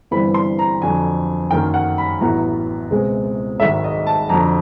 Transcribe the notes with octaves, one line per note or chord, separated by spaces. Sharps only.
G1 G2 E3 G3 C4 B5
C6
A#5
F2 D3 F#3 G#5
F#2 D#3 F#3 A#3 G5
F#5
B5
A1 A2 F#3 B3 A#5
C#2 B2 G#3 C4
G#1 G#2 D#3 F#3 E5
D#5
A5
F2 D3 F#3 A#5